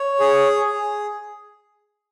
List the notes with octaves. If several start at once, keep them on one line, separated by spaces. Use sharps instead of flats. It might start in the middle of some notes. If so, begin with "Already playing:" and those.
Already playing: C#5
G#4
G#4